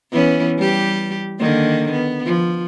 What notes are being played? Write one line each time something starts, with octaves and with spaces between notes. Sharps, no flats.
E3 B3 C#4
G3 G4
D3 D#3 A#3
B3
F3